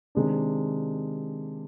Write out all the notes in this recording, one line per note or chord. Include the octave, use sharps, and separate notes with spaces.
C3 D#3 G#3 D4